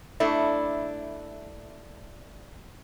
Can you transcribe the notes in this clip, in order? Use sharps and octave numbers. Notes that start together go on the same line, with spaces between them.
A3 D4 E4